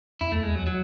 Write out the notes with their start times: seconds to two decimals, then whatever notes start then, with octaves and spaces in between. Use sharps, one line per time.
0.21 E2 E4
0.32 E2 A3
0.43 G#3
0.51 E2 F#3
0.67 F#3